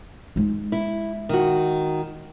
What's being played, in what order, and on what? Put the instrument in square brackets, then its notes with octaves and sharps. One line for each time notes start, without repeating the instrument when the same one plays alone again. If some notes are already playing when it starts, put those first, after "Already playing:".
[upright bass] G#3 D#4
[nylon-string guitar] E4
D#3 F#4